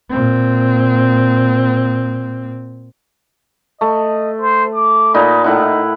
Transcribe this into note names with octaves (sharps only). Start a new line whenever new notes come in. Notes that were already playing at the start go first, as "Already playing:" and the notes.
A#2 C4
A3 D#5
C5
D6
A#2 D#4 B5
A2 D#4 E4 F#5